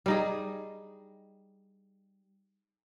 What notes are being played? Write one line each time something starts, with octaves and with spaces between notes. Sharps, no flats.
G3 D#4 G#4